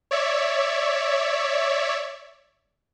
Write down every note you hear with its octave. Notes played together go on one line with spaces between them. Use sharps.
C#5 D5 E5